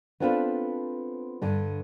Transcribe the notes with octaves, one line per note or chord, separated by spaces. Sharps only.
B3 C4 D4 F4 A4 B4
G2 D3 D4